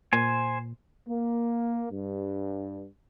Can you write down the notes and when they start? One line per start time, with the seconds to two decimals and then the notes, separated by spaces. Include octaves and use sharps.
0.13 A#2 C5 G#5
1.08 A#3
1.92 G2